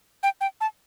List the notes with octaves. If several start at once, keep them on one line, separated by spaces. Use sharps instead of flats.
G5
G5
A5